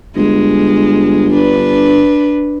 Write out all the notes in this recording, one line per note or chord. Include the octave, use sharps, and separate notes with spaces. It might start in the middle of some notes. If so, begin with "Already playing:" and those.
G1 G#3
D4 B4